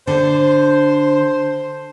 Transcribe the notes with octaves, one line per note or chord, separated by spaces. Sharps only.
D3 C5